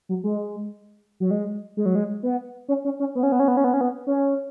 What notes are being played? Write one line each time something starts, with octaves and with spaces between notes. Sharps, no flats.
F#3
G#3
F#3
G#3
G#3
F#3
G#3
B3
C#4
C#4
C#4
B3
C#4
B3
C#4
B3
C#4
B3
C#4
B3
C#4